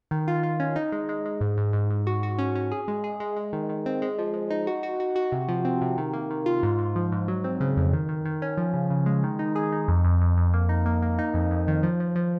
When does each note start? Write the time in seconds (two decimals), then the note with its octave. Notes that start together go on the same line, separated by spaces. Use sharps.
0.11 D#3
0.28 F4
0.43 F4
0.60 C#4
0.76 D#4
0.92 G#3
1.09 G#3
1.26 G#3
1.41 G#2
1.58 G#2
1.73 G#2
1.90 G#2
2.07 F#4
2.23 F#4
2.39 C#4
2.55 C#4
2.71 G#4
2.88 G#3
3.04 G#4
3.20 G#3
3.36 G#3
3.53 D#3
3.69 D#3
3.86 C4
4.02 G#3
4.19 F3
4.34 G#3
4.50 D#4
4.67 F#4
4.83 F#4
5.00 F#4
5.16 F#4
5.32 C3
5.48 F3
5.65 C4
5.82 C3
5.98 D#3
6.13 A#3
6.30 D#3
6.46 F4
6.63 G#2
6.78 G#2
6.96 F3
7.12 G#2
7.28 F#3
7.44 C4
7.60 C#3
7.77 F2
7.93 D#3
8.09 D#3
8.25 D#3
8.42 C#4
8.57 F3
8.74 C#3
8.90 C#3
9.06 G#3
9.23 D#3
9.39 D#4
9.55 G#4
9.72 D#4
9.88 F2
10.05 F2
10.21 F2
10.37 F2
10.54 A#3
10.69 D#4
10.86 A#3
11.02 A#3
11.19 D#4
11.34 F2
11.51 F2
11.68 D#3
11.83 F3
12.00 F3
12.16 F3